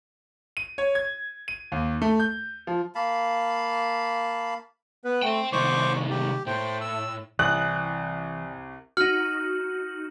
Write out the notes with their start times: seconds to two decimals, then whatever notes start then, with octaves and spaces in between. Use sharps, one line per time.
0.57 D#7
0.78 C#5
0.95 G#6
1.48 D#7
1.72 D#2
2.02 A3
2.20 G6
2.67 F3
2.95 A#3 F5 A5 B5
5.04 B3 B4
5.23 A3 C5 G5
5.52 C2 D#3 C5 C#6 D6
6.10 G4
6.46 A2 C5 G5
6.81 E6
7.39 C2 E3 D5 G#5 D#6 F#6
8.97 D#4 F#4 F6